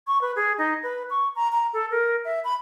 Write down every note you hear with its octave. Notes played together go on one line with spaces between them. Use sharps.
C#6
B4
G#4
D#4
B4
C#6
A#5
A#5
A4
A#4
E5
B5